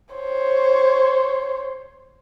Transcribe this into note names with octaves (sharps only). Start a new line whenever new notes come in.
C5 C#5